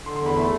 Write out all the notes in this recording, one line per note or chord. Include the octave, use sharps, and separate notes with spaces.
D3 C6
C6
E2 B5
A3 B5